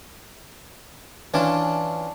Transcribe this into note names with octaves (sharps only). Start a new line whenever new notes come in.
E3 C#4 D4 F4